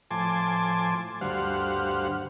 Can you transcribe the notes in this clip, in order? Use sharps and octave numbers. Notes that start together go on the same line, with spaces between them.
A2 F3 G#5 A5 C6 D6
D2 G2 G3 C5 F5 F#5